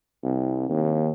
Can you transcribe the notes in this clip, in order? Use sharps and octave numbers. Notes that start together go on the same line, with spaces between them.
C2
D#2